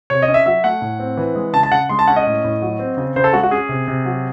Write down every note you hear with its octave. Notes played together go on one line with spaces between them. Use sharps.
C3 C#5
D#5
C#4
E5
F#3 E5
A3 F#5
A2
C4
E3
G#3
C#3 A5
A5
C#3 F#5
G#3 C6
A5
C#4 F#5
D#5
A2
A2
F#3
C4
C#3
C#3 C5
A4
G#3 F#4
F#4
C#4 G#4
C3
C3
F#3